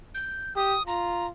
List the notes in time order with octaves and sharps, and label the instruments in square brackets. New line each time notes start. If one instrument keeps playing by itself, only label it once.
[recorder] G6
[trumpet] G4 [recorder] D#6
[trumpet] F4 [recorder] A#5